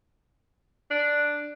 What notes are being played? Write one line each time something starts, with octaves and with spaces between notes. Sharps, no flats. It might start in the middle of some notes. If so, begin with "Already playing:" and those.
D4